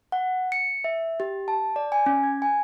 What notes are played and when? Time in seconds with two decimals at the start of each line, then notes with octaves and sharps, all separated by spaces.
0.12 F#5
0.52 C#7
0.84 E5
1.20 G4
1.48 A5
1.76 D5
1.92 G#5
2.06 C#4
2.23 G#6
2.42 G#5